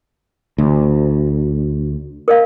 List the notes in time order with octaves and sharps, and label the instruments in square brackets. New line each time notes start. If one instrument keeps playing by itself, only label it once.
[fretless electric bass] D2
[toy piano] A#4 D#5 F5